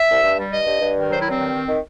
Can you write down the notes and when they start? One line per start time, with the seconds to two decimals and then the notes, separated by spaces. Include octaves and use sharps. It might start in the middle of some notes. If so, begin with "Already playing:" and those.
Already playing: E5
0.09 C2
0.23 G2
0.38 G3
0.51 G2 D#5
0.66 G2
0.80 G2
0.95 D#3
1.11 F#3 C5
1.20 E4
1.25 G2 C4
1.39 D#3
1.54 D#3
1.68 D#3